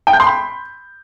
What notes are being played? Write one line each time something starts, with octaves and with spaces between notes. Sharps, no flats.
G5
G6
C6
B5